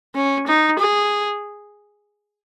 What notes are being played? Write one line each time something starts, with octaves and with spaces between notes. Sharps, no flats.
C#4
D#4
G#4